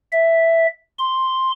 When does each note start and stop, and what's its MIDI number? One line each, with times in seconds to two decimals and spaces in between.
0.12 0.67 76
0.99 1.52 84